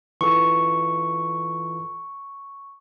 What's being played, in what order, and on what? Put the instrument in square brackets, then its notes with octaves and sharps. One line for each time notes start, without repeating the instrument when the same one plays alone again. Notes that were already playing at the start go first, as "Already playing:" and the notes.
[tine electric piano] E3 F4 A4 [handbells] C#6